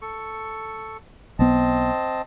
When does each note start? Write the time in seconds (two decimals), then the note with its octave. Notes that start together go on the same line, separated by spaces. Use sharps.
0.02 A4 C#6
1.39 B1 B3 C4 D#5 A5